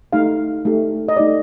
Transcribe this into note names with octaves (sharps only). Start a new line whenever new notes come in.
A3 D#4 G4 F5
A3 D#4 G4
D#5
A3 D#4 G4 D5